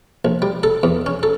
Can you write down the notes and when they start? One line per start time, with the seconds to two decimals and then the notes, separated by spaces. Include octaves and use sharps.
0.25 A#1
0.42 G3
0.63 A4
0.83 E2
1.06 C#4
1.23 A4